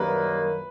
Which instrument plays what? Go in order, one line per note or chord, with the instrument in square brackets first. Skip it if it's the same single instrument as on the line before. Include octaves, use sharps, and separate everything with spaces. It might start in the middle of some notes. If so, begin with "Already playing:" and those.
Already playing: [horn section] F#2 D#3 G3 A#3 [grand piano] B4